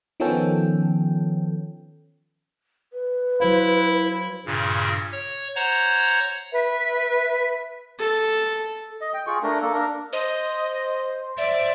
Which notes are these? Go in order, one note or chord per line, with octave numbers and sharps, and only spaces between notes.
D#3 F3 B3 C#4 A4 G5
B4
F#3 E4 C5 F5
G2 A#2 C#3
C#5
C5 C#5 F#5 A#5 G#6
B4 E5
A4
D#5
G5
F4 G#4 C#6
A3 D4 A#4
A#3 A4
D4 A#4
C5 D#5
D5 E5